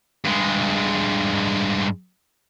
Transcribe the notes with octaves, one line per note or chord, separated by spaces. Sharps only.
G2 G#3